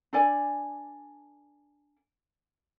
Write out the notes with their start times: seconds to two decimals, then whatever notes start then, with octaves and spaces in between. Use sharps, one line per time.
0.13 D4 A4 D5 G#5